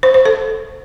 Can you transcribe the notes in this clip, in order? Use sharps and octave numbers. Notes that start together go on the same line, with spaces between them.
C5
C5
A4